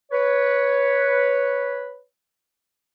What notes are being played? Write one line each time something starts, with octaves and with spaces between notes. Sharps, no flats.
B4 C#5